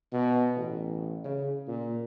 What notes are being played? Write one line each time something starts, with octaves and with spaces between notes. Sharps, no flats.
B2
A1
C#3
A#2